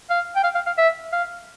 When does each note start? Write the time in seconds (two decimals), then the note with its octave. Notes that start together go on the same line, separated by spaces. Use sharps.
0.10 F5
0.36 G5
0.44 F5
0.55 F5
0.66 F5
0.78 E5
1.13 F5